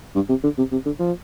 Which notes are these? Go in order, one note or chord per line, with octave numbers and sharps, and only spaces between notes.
G2
C3
D3
C3
C3
D3
F3